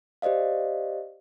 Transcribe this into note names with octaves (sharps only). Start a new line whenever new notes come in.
G4 C5 D5 D#5 F5